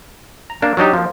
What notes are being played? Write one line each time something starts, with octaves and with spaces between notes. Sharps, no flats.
A#5
A#3 D4
F#3 D4 D#4 G4
F3 A#3